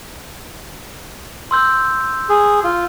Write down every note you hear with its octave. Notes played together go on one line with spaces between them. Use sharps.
C6 E6 G6
G#4
F4